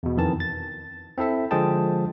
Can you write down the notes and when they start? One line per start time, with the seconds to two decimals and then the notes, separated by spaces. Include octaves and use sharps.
0.03 E2 B2
0.17 F2 D#3 E3 A5
0.40 A6
1.18 C4 E4 A4 E5
1.51 D3 F3 G#3 G#4 G5 A5